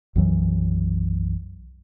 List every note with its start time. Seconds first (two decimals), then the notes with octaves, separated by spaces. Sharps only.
0.15 B1 F#2 E3 F#3